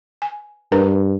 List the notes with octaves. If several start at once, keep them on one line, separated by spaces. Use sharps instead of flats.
G#5
G2 D4 A#4 B4